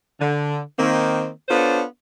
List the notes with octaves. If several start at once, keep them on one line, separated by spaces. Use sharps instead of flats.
D3
D#3 A#3 C4
B3 D4 F4 A4 C5 C#5